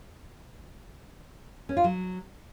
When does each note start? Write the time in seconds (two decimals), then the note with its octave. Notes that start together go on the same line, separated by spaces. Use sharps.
1.69 C#4
1.77 F4
1.84 F#3